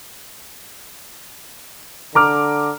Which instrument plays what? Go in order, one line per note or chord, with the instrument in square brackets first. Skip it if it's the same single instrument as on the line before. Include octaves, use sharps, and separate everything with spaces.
[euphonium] D3 [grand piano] A#5 D6 F6